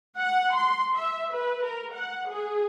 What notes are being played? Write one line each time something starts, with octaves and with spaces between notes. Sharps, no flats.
F#5
C6
E5
B4
A#4
F#5
G#4